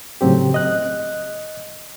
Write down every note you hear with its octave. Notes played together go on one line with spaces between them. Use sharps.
A2 C#3 F#3 C4 G4
D#5 F#6